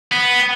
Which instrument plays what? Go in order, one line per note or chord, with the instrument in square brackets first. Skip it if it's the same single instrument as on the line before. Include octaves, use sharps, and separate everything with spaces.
[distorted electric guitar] B3